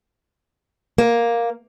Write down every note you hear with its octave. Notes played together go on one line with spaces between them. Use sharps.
A#3